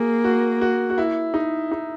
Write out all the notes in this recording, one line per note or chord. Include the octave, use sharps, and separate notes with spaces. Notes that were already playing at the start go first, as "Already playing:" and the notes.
Already playing: A#3 F#4 G#4
F#4
F#4
F#4
E4
D#4
D#4